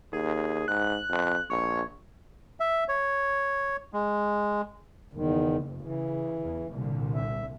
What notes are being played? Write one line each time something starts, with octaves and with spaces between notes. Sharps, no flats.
D#2 G#4
G#2 F#6
F2
A#1 C#5
E5
C#5
G#3
F#1 E2 D#3
C#3 E3
E2 C#3
C2 A#2 D3
E5